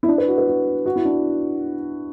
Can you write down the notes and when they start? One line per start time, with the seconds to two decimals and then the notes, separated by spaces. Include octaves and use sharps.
0.03 E4
0.08 D4
0.18 B4
0.28 F#4
0.38 B4
0.48 F#4
0.86 F#4
0.96 E4
1.05 D4